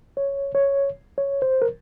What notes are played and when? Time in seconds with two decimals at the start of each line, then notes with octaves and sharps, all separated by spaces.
0.17 C#5
0.55 C#5
1.18 C#5
1.42 C5
1.62 A#4